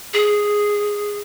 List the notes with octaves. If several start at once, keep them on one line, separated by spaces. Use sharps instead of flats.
G#4